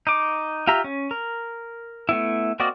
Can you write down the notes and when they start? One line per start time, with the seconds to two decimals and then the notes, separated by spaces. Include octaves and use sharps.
0.07 D#4 D6
0.67 F4 G4 E5 A#5
0.84 C#4
1.11 A#4
2.09 A3 B3 E4
2.60 A#3 C4 F#4 D5 D#5